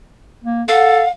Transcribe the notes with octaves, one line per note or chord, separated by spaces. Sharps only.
A#3
A4 F5 F#5